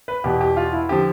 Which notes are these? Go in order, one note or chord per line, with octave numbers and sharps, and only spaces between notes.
B4
E2 B2 G4
G4
F4
E4
D3 F3 G4